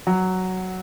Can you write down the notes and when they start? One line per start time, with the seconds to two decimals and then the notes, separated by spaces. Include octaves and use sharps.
0.07 F#3